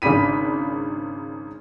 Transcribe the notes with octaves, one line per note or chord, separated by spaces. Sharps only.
G#1 C#3 D4 B5 B6 D#7